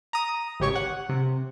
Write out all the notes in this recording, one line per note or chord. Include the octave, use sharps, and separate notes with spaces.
A#5 D#6
G#1 C#2 G4 C#5 C#6
F#5
C3